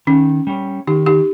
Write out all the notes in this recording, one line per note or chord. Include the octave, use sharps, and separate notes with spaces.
D#3 C#4
G3 C#4
D#3 D#4 G4
D#4 G4